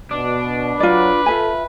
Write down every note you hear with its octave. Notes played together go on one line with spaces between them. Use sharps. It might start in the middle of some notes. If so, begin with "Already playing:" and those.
B2 D4
F#3 F4 B4 D5
F4 A4 E5 G#5